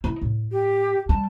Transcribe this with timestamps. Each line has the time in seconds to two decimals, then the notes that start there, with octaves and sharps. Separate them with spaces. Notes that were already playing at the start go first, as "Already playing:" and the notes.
0.04 D#4 E4
0.22 A2
0.52 G4
1.09 G3 A5